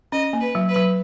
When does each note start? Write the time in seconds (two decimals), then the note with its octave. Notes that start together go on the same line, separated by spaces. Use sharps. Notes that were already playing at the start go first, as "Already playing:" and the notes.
0.12 C#4 D#5
0.33 A#3
0.40 B4
0.55 F#3
0.69 B4
0.76 F#3